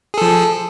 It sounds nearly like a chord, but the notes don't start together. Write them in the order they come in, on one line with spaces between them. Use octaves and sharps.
G#4 A4 F3